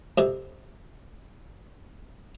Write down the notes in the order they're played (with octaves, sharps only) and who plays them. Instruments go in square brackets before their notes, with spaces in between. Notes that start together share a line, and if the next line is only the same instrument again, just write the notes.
[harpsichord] F2 C3